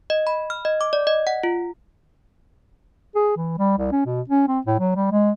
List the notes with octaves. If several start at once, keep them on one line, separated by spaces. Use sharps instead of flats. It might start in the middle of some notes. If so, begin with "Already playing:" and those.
D#5
B5
F6
D#5
D6
D5
D#5
F#5
F4
G#4
E3
G3
C2
C#4
B2
C#4
C4
A2
F#3
G3
G#3